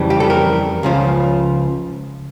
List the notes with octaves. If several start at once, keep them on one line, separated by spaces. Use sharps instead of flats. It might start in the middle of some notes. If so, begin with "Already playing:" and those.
Already playing: F2 C#3 E3 G3
G4
A4
A#4
C#2 C#3 F3